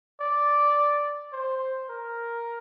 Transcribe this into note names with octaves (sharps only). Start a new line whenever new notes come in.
D5
C5
A#4